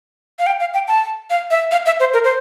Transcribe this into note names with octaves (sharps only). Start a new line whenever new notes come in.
F5
G5
F5
G5
A5
F5
E5
F5
E5
C5
A#4
C5